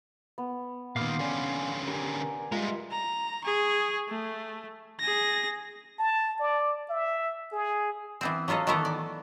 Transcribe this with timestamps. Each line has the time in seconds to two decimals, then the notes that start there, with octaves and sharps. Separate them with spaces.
0.38 B3
0.96 A#2 D#3 B3 F5 C6 D6 F6
1.19 D3 C#4 D5 G5 G#5
1.88 G4 A#4 G#5 D6
2.52 G3 G#3 F4 A#4 D#5 E5
2.92 A#5
3.45 G#4 C#6
4.09 A3
5.00 G#4 A#6
5.99 A5
6.40 D5
6.90 E5
7.52 G#4
8.21 E3 B3 C4
8.48 F#3 B3 F4 A4 D#5
8.67 D#3 E3 A3 B3 A4 A#4
8.85 D5